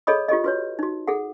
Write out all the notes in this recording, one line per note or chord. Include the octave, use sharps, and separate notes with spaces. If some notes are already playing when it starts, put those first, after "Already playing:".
G#4 A4 C#5 D#5 B5 D#6
F4 G4 A4 D#5
F#4 B4 C#5
D#4 F#4
G#4 A4 F#5